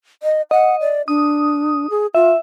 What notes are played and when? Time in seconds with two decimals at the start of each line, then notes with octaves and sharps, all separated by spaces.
0.23 D#5
0.51 D#5 F#5
0.81 D5
1.08 D4 D#6
1.90 G#4
2.15 F4 E5